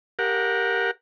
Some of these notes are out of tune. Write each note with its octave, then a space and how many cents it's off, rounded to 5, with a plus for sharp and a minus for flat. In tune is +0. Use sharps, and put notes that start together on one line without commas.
G4 +0 A#4 +0 F#5 -25